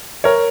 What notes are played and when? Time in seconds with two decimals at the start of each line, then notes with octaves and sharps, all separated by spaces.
0.24 A#4 C#5